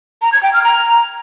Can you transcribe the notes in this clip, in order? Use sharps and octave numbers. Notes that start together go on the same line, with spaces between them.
A#5
G#6
G5
F6
A#5